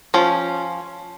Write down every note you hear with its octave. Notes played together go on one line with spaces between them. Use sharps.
F3 C#4